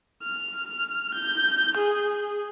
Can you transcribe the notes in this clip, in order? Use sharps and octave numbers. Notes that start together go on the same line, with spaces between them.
F6
G6
G#4